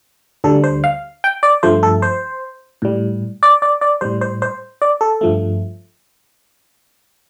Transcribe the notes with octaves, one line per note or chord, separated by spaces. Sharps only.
D2 D3 G3 A4
C5
F5
G5
D5
G2 F3 A3 C5
A4
C5
A2 G3
D5
D5
D5
A2 G3 C5
C5
C5
D5
A4
G2 F3 A3